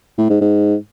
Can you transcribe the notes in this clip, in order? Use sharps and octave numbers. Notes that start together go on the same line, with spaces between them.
A2
G#2
G#2